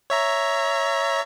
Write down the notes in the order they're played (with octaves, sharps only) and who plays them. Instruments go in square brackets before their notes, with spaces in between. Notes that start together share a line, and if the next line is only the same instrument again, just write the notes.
[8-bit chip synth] C#5 E5 A#5